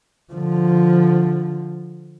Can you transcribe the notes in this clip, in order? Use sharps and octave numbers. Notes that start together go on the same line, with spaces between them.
D3 F3